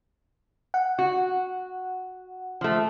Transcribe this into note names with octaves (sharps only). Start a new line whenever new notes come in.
F#5
F#4
F3 A3